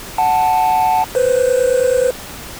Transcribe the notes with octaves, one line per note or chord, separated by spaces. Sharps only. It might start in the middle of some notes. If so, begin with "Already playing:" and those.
F#5 A5
B4 C5